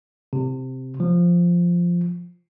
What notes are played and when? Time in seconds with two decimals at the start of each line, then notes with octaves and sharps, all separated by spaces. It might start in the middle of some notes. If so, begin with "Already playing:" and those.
0.33 C3
1.00 F3